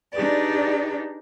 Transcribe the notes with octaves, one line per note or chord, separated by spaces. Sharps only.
D4 D#4 G4 G#4 B4 D5